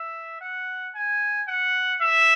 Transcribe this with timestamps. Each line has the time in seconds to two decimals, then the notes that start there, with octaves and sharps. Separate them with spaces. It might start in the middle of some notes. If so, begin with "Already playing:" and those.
Already playing: E5
0.41 F#5
0.95 G#5
1.48 F#5
2.02 E5